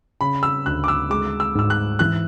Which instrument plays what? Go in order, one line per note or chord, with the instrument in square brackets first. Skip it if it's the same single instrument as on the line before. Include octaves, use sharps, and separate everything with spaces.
[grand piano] C#3 [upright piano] B5
[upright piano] E6
[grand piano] D2 [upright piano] F#6
[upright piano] D6
E6
[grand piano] G#3 [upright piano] D6
[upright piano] E6
[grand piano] G#2 [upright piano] E6
[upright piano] F#6
[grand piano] E3 [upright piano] F#6